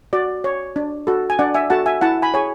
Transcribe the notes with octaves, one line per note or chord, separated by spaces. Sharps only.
F#4 D5
C#5
D4
F#4 A4
G#5
D4 D5 F#5
E5 G#5
F#4 A4 F#5 A5
E5 G#5
E4 F#5 A5
G#5 B5
G#4 C#5 G#5